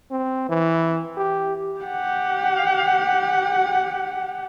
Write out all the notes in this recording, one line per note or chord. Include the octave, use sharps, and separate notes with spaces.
C4
E3
G4
G4 F#5